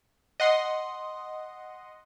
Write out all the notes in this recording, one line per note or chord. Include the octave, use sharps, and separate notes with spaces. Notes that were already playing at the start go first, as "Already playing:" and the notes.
D#5 F#5 C6